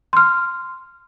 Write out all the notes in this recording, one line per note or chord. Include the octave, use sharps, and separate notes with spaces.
C6 F6